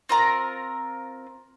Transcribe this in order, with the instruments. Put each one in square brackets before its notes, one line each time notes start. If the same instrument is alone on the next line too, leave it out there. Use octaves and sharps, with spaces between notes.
[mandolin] C4 F4 A#4 A#5